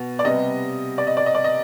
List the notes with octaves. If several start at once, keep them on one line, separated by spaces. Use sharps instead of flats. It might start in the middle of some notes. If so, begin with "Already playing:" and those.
Already playing: B2
D5
C3 G3 B3 D#5
D5
D#5
D5
D#5
D5
D#5